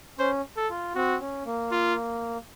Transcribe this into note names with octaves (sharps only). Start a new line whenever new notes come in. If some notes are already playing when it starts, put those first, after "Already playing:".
C#4 C5
A4
F4
C4 F#4
C#4
A#3
F4